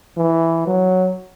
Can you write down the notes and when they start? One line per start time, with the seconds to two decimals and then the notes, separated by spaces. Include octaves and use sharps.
0.17 E3
0.67 F#3